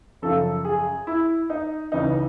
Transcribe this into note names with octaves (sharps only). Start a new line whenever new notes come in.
F#2 C#3 F3 A4
G#4
E4
D#4
C#2 C#3 E3 D#4